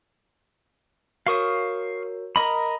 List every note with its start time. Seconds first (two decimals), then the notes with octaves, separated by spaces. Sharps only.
1.27 F#4 A#4 C#5 F5 C#6 D#6
2.36 A#4 D#5 B5